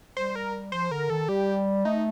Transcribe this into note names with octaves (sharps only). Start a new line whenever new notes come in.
G3 C5
A#4
F3 C5
D3 A#4
D#3 A4
G3 G4
A3 D#4